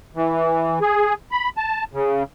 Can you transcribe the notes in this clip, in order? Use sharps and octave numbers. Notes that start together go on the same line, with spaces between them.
E3
G#4
B5
A5
C#3